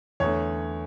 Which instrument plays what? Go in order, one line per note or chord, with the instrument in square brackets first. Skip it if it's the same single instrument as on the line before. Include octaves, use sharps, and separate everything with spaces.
[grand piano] E2 D3 A3 C#5